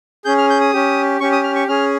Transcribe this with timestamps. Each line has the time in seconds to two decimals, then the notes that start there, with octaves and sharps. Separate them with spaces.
0.25 C#4 G#4 G6
0.38 F6
0.50 G6
0.61 D#6
0.73 C#4 G4
1.20 C#4 G4 C#6
1.32 D#6
1.44 F6
1.55 C#6
1.68 C#4 G#4 F6